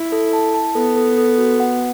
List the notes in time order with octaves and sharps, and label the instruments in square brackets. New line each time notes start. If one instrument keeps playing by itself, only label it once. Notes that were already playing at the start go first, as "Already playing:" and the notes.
Already playing: [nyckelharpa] E4
[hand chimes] A4
A5
A5
[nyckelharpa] B3 [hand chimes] A4
[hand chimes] A4
A4
F#4
F#5